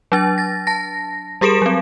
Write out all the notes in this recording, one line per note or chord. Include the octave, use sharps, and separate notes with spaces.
F#3 D4 A6
A6 A#6
A5 A#6
G3 G4 G#4 A#4 D7 E7
F#3 C4